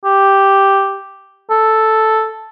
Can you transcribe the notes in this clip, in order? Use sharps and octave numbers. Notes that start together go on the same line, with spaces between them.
G4
A4